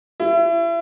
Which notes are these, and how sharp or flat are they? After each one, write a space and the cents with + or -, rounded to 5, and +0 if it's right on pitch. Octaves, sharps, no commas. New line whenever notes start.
E4 +35